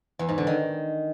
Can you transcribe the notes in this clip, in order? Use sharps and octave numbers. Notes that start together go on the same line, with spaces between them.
E2
G#2
D3
D#3